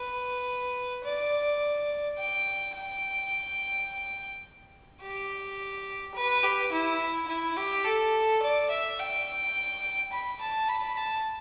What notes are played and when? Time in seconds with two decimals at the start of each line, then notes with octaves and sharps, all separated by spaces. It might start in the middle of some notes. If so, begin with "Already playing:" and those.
Already playing: B4
1.04 D5
2.18 G5
2.75 G5
5.01 G4
6.15 B4
6.43 G4
6.72 E4
7.28 E4
7.56 G4
7.85 A4
8.42 D5
8.70 E5
8.99 G5
10.12 B5
10.41 A5
10.69 B5
10.97 A5